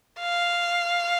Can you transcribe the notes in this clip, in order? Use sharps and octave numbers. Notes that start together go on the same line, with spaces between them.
F5